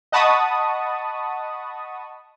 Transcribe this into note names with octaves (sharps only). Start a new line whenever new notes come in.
D#5 F#5 A5 B5 C#6 D#6